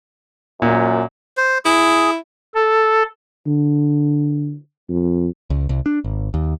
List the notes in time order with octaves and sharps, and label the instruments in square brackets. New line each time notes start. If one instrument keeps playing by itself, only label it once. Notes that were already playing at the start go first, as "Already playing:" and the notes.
[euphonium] F#2 [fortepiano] A#2
[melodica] C5
[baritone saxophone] E4 [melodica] G#4
[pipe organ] A4
[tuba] D3
F2
[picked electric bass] C#2
C2
D4
G#1
D#2